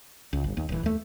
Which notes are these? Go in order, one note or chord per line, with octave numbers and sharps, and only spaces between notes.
C#2
G1
D#2
D1 E3
D#2 A3